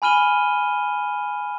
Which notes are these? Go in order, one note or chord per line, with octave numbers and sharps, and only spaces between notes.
G#5 B5 F6 D#7 G7